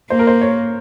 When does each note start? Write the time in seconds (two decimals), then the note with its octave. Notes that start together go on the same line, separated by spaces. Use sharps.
0.10 A#3 C5
0.19 A#4
0.27 C5
0.41 C#5